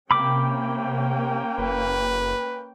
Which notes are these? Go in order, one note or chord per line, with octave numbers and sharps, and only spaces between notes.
C3 A#3 C#4 G5 B5 D6
F#1 B4